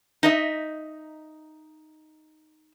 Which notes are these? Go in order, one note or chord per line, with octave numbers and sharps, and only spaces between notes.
D#4 D#5 E5